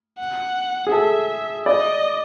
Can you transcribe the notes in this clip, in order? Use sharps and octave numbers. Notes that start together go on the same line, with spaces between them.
F#5
G#4
A4 E5
D5 D#5